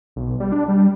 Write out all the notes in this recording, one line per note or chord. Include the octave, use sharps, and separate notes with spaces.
B1
G3
D4
G3